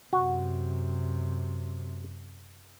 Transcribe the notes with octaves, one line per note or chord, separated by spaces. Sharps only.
F#2 C3 F#4